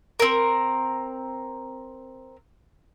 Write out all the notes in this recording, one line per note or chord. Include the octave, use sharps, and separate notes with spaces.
C4 A#4